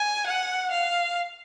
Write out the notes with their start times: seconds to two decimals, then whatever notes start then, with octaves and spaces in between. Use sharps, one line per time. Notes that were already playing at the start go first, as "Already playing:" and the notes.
Already playing: G#5
0.27 F#5
0.71 F5